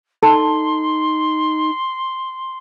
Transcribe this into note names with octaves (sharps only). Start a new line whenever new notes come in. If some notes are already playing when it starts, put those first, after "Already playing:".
D#4 A4 A5 C6